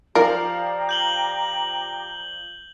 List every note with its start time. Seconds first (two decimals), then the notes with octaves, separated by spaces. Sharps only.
0.15 F3 G4 A#4 D5 F5 A#5
0.89 G6 F#7 G7